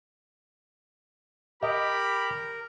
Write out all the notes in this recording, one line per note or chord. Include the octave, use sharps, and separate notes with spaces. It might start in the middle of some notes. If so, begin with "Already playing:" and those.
G4 A#4 D#5 B5